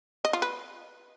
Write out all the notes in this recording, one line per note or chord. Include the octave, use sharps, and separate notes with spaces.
D#5
F4
B4